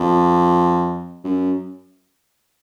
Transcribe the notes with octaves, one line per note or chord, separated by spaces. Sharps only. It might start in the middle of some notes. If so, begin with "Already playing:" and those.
Already playing: F2
F#2